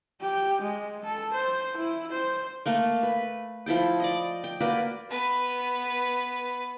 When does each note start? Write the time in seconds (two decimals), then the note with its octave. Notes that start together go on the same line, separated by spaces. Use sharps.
0.21 G4
0.61 G#3
1.05 A4
1.34 C5
1.77 E4
2.12 C5
2.66 A3 A#3 A4
3.03 B4
3.66 F3 E4 A4 G5
4.00 D5 D#5
4.44 G5
4.60 A#3 F#4 B4 D5
5.10 B3 B4